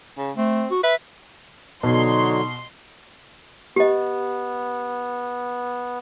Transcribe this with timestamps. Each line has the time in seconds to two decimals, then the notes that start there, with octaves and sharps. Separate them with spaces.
0.18 C#3
0.37 A3 C4
0.71 F#4
0.83 B4 E5
1.83 B2 D3 F#3 D#4 C#5 C6
3.76 B3 G4 D#5